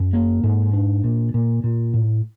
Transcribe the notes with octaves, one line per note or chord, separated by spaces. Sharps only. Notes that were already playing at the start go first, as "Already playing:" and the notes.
Already playing: F#2
A#3
G#2
D4
A#2
A#2
A#2
A2